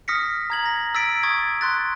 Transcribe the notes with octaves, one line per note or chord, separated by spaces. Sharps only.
D#6 F6 A#6 B6 C#7
A#5 G#6 F#7
A#6
E6 A6 B6 D7
C#6 D#6 G#6 A6
C6 F#6 A6